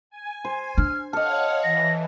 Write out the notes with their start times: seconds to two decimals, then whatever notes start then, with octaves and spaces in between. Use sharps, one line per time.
0.10 G#5
0.45 C5
0.78 D4 F6
1.13 A4 C#5 D#5 F5 F#5 F6
1.63 E3 A#6